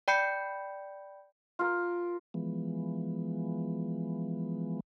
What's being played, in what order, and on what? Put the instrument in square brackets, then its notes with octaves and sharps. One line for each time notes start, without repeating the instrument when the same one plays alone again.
[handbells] D5 G5 B5 G6 C#7
[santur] F4 A#4
[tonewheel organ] E3 F3 G#3 B3